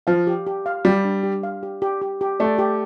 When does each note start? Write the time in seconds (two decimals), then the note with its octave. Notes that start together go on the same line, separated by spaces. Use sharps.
0.07 F3 F5
0.27 G4
0.47 G4
0.66 F5
0.85 G3 G4
1.05 D4
1.23 G4
1.43 F5
1.63 G4
1.82 G4
2.01 G4
2.21 G4
2.40 A3 D5
2.58 G4